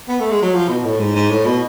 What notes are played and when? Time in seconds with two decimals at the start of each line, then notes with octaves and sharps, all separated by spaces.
0.08 B3
0.20 A3
0.31 G#3
0.42 F#3
0.54 F3
0.69 B2
0.84 A2
0.99 G#2
1.15 G#2
1.30 A2
1.45 B2